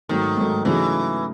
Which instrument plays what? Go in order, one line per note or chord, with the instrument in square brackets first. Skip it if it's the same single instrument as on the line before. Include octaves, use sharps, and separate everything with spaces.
[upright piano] G#2 F#3 A3 [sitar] D#3
[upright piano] G#2 F#3 A3
[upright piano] C#3 F#3 A3 D#4 G#4 [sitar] E3